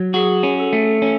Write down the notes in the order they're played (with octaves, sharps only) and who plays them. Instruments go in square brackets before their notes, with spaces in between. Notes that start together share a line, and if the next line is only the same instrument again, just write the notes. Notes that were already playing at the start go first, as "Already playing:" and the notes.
Already playing: [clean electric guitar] F#3
[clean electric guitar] F#4 [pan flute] G#4
[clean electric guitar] C#4
[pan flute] A4
[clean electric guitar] A3
C#4